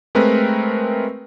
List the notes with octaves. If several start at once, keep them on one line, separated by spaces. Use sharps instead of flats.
G#3 A3 C4 A#4 B4